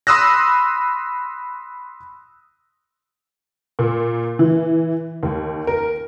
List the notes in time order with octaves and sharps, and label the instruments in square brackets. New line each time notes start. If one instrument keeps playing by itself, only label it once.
[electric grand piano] B5 C6 D#6 E6 F#6 A#6
[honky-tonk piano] A#2
E3
D#2
A#4